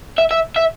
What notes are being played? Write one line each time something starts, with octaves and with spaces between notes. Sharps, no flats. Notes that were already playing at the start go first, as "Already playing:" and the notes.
E5
E5
E5